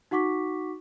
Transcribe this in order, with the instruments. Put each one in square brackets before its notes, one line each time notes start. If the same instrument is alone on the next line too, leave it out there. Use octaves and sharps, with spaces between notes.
[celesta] D#4 F#4 F#5 C#6 D6 B6